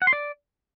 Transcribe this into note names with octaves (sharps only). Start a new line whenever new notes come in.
F#5
C6
D5